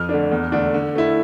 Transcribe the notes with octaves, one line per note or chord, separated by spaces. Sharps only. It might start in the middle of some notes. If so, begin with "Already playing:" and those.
Already playing: F2 F6
D3 A3 D4
E2
D3 A3 D4
D3
A3 E4